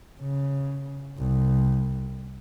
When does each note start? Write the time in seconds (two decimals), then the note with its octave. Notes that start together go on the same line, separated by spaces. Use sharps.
0.21 C#3
1.18 C2